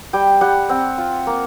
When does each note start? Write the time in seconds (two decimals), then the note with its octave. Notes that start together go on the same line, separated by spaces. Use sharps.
0.13 G3 G5
0.41 G3 F#5
0.69 C4 F#5
0.98 F4
1.27 A#3